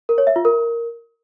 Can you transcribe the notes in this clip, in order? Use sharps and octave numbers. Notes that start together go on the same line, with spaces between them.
A#4
C#5
E5
F4
A#4